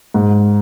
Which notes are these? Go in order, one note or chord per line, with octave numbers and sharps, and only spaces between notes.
G#2